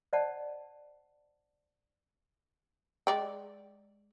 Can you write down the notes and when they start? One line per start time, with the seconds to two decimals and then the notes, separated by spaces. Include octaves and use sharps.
0.13 C5 D5 D#5 F#5 A5
3.07 G#3 D5 G5